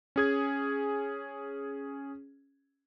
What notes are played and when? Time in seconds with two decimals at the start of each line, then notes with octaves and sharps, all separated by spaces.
0.16 C#4 G#4 G#6